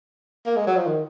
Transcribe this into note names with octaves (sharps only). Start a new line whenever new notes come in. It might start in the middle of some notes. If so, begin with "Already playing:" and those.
A#3
G#3
F#3
F3
D#3